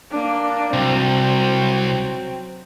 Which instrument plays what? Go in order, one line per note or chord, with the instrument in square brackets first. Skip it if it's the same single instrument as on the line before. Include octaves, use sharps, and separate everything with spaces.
[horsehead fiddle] A#3 D4
[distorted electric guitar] C2 [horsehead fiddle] F#3 C4